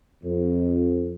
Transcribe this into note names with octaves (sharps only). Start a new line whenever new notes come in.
F2